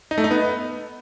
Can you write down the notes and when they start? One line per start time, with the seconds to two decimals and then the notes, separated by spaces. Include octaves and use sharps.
0.11 D#4
0.18 A3
0.24 D#4
0.31 B3